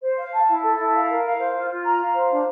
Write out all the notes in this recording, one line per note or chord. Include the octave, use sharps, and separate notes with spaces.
C5
F5
A5
E4
A4
E4
F5
A#4
F5
C5
F4
F4
A#5
F5
C5
D4